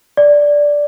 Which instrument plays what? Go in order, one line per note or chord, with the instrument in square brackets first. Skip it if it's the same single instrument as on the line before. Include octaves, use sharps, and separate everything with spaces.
[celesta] D5